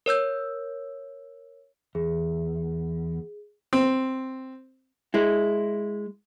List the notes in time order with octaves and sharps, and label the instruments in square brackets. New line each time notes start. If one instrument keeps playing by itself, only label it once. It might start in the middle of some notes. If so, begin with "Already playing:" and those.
[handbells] A#4 C#5 E6 G6
[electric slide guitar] E2 [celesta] G#4
[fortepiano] C4
[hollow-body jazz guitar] G#3 E4